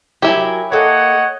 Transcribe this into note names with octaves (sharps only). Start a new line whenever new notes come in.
F#3 E4 G4 A#4 G#5
A#3 A4 C#5 D#5 F#5